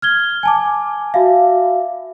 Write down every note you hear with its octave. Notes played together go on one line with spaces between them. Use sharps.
F6 G#6 G7
G#5 A5 D6
F#4 E5 F5